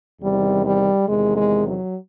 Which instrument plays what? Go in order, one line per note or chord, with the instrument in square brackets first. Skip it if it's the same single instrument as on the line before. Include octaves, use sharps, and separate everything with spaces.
[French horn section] E2 C3 D#3 G3
G3
E2 C3 D#3 G#3
G#3
F#3